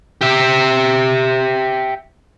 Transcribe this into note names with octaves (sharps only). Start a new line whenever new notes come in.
G4 E5